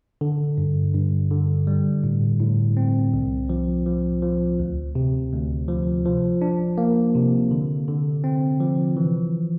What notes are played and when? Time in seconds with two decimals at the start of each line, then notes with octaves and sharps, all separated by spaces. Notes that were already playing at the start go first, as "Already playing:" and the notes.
0.21 D3
0.58 G2
0.94 G2
1.31 D3
1.67 G3
2.04 A2
2.40 A2
2.77 C4
3.13 C2
3.49 F3
3.86 F3
4.22 F3
4.59 D2
4.95 C3
5.33 D2
5.68 F3
6.05 F3
6.42 D4
6.78 A#3
7.15 C3
7.51 D3
7.88 D3
8.24 C4
8.60 F3
8.97 E3